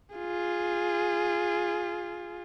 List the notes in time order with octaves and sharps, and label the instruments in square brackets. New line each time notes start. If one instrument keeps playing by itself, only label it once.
[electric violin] F4 G#4